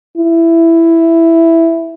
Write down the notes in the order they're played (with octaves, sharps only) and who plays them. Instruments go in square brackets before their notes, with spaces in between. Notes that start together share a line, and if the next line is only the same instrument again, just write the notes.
[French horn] E4